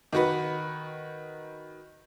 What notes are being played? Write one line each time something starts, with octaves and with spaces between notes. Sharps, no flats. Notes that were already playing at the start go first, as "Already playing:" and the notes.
D#3 F#4 B4